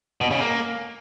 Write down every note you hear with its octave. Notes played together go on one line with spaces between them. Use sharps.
B2
C#3
A#3